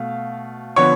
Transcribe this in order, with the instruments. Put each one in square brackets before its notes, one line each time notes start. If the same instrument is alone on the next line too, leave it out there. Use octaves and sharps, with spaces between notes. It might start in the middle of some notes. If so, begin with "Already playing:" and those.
Already playing: [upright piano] B2 A3 F5
D3 F3 B3 C#5 C#6